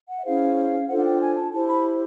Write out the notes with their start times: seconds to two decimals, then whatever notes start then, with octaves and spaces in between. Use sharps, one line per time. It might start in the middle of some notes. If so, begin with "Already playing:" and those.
0.09 F#5
0.18 E5
0.25 C#4 E4 G#4 C5 F5
0.89 D4 F4 A4 C5 F#5
0.99 F#5
1.04 G5
1.20 G#5
1.36 A5
1.52 E4 G4 C5 A5
1.68 B5